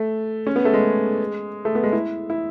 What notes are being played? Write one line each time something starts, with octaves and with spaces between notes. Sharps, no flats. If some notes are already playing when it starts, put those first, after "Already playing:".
Already playing: A3
C#4
B3
A3
G#3
A3
B3
G#3
E4
E4